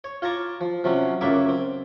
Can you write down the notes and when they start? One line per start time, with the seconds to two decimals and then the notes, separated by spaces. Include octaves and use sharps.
0.04 C#5
0.22 F4 C#5 A5 A#5 C#6 D6
0.61 F3
0.84 C3 F3 F#3 C#4
1.21 C#2 F#2 A#3 C#5 E5 D6
1.49 C4